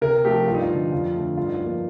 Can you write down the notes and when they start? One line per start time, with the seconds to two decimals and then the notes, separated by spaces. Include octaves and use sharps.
0.01 C3 A#4
0.24 F3 A3 G4
0.47 G2 F4
0.54 D#4
0.62 F4
0.69 D3 F3
0.92 F2 F4
1.15 D3 A3
1.37 G2 F4
1.46 D#4
1.55 F4
1.60 F3 A#3